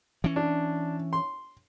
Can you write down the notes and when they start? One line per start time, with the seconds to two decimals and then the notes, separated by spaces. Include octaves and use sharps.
0.24 E3 C#4
0.36 D4
1.13 C6